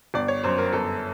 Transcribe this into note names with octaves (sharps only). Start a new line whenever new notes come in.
G1 D5
C#5
F#2 C5
A#4
G1 A4